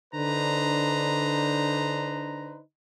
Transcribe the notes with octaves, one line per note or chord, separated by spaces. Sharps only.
D3 D4 D#4 B4 C5 A#5